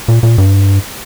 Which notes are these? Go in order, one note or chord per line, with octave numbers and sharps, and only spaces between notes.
A#2
A#2
G2